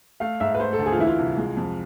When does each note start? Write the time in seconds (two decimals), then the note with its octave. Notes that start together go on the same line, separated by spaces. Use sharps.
0.20 A3 F5
0.40 G#2 E5
0.55 B4
0.60 A3 C5
0.73 A4
0.79 D2
0.86 G#4
0.92 F4
0.99 E3 E4
1.07 F4
1.19 C2
1.38 G#3
1.57 F2